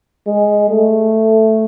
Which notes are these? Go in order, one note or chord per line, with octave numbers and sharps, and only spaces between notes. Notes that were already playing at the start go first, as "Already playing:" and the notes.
G#3
A3